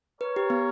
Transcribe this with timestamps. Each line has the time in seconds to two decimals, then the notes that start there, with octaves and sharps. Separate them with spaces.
0.21 A#4 B4 C#5
0.36 G4
0.50 B3